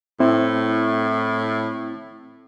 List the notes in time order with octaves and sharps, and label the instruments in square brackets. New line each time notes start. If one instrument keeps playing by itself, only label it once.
[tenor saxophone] A2 [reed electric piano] C4 E4